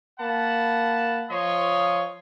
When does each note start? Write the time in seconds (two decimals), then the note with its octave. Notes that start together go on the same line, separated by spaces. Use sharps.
0.20 A#3 F#5 A5 B5
1.31 F3 C#5 D#5 C6